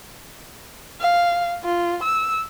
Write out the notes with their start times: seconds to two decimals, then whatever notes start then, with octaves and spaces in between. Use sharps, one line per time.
1.00 F5
1.65 F4
2.03 E6